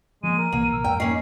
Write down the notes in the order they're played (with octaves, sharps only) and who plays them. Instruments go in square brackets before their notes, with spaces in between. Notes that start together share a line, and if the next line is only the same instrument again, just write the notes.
[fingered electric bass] F3 G3 A#3 [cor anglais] G#3 [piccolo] D#7
[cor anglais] A#4
[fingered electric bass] C2 C3 E3 [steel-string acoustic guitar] A#3
[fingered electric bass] A#1 [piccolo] E6
[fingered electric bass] F2 G#2 [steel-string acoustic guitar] G5
[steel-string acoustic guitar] A#3 D#4 [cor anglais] C#4 [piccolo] C7